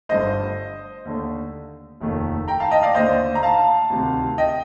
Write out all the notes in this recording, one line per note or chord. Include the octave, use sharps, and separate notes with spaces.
G1 G2 D3 A3 C5 D#5
D#2 D3 A3
F1 D#2 D#3 A3
G5 A#5
F5 A5
D#5 G5
D5 F5
D#2 D3 A3 C5 D#5
A#5
F5 A5
D2 C3 D#3
D#5 G5